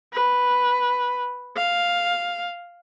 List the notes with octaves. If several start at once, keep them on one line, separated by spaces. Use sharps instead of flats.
B4
F5